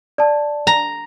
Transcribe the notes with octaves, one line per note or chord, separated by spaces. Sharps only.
D5 A5
A#5